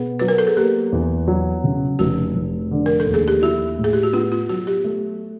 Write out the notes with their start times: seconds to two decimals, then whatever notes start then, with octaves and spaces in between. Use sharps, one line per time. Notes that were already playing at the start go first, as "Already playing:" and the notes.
Already playing: B2 B3 G#4
0.20 F#3 B4
0.28 A#4
0.38 A4
0.47 G#4
0.57 A#3 G4
0.92 E2
1.28 F#3
1.64 C#3
1.99 F1 F#4
2.36 F1
2.71 D3
2.86 A#4
3.00 A4
3.07 D#2
3.14 G#4
3.28 G4
3.42 E4 F#4
3.78 A2
3.84 G#4
3.93 G4
4.03 F#4
4.13 B3 F4
4.32 F4
4.49 F#3 F#4
4.67 G4
4.84 A3